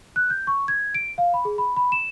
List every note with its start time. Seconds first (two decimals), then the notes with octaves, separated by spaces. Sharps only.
0.16 F#6
0.30 G6
0.47 C#6
0.68 G#6
0.95 D7
1.18 F5
1.34 B5
1.45 G#4
1.58 B5
1.77 B5
1.92 E7